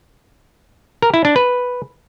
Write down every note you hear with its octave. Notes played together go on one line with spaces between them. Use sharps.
A#4
E4
D4
B4